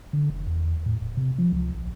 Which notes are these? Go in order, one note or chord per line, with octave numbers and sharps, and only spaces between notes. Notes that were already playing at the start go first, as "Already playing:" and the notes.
D3
F1
E2
A2
D#1
C3
F3
C#2
A#1